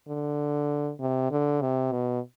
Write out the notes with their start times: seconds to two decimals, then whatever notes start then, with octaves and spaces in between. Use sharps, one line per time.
0.08 D3
1.00 C3
1.31 D3
1.61 C3
1.92 B2